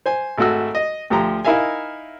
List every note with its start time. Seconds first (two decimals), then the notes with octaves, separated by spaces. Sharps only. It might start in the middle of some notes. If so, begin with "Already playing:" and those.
0.06 C5 G#5
0.38 G#1 A3 F#4 E6
0.75 D#5
1.10 D2 F3 G4 A#5
1.45 D#4 E4 A#4 E5 F5 G#5